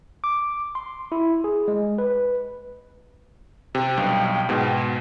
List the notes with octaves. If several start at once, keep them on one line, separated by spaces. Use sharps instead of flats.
D6
C6
E4
G#4
G#3
B4
C3 G5
B1 G2
G#2 B2